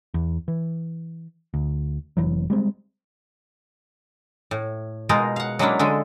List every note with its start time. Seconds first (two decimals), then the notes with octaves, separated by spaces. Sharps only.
0.14 E2
0.48 E3
1.54 D2
2.17 F1 F2 E3 F#3
2.50 G3 G#3 C4
4.51 A2
5.09 B2 G#3 D#4 F4 A#4
5.36 F5 F#5
5.59 F#3 G#3 A#3 C#4 D4 E4
5.79 D3 G#3 A4 G#5